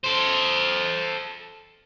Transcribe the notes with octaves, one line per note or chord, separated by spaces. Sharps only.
A4 C5